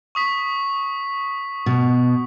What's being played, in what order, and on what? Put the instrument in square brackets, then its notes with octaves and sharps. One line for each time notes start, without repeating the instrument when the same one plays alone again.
[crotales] C#6 D#6 B6
[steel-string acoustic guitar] B2